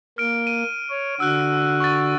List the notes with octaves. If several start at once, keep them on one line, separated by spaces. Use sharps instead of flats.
A#3 F6 D7
D#7
C#5
D3 F#4 E6 F#6
C#6 A6